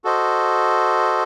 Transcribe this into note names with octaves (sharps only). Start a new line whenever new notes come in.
F#4 A4 C5 D#5